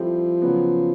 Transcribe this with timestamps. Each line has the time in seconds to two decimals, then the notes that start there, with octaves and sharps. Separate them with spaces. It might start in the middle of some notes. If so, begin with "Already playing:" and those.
Already playing: F3 G3 C4 E4 A4 C5
0.42 C#3 F#3 B3